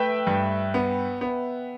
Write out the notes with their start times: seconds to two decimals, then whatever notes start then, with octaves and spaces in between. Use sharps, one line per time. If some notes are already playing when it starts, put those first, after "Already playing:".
Already playing: A3 B4 E5 G5
0.27 G2
0.74 B3
1.21 B3